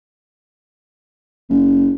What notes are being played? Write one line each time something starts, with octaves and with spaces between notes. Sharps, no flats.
F#1